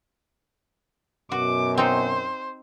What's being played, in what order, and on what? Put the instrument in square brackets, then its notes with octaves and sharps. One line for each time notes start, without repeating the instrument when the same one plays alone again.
[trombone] F#2 [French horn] B2 [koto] F#4 [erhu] D6
[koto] C4 D#4 [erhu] C5